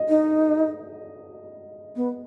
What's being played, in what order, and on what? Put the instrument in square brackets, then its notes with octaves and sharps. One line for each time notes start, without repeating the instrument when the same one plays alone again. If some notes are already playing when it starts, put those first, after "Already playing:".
Already playing: [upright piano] D#5
[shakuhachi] D#4
B3